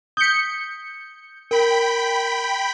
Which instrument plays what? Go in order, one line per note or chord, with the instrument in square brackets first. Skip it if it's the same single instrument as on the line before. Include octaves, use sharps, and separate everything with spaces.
[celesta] D#6 B6 [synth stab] G6 C#7
[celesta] A#4 [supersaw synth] G5 B5 B6